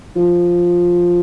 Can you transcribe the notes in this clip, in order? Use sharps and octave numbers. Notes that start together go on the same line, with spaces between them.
F3